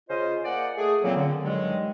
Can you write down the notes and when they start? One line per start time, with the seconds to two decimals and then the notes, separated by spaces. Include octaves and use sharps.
0.09 C#3 C#4 F4 C5 D#5
0.45 A#3 G#4 D5 F#5
0.77 A3 G#4
1.02 A#2 C#3 E3 F#3 A#3 C4
1.15 D3
1.43 G2 D#3 E3 F#3 G#3